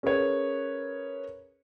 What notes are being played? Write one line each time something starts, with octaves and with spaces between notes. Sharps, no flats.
C#4 G#4 A#4 B4 C#5